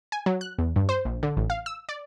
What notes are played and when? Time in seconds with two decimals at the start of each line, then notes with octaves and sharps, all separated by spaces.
0.12 G#5
0.26 F#3
0.41 F#6
0.58 E2
0.76 G2
0.89 C5
1.05 A#1
1.23 D3
1.37 A1
1.50 F5
1.66 E6
1.89 D5